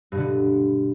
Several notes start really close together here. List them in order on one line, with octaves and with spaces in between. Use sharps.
G2 B2 D3 B3